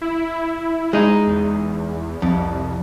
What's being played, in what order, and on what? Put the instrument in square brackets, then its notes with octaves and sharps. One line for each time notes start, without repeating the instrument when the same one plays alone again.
[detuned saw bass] E4
[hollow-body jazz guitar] G#3 D#4
[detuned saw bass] E2
[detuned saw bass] C2 [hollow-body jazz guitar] F2